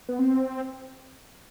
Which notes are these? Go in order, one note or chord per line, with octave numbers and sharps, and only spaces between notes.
B3
C4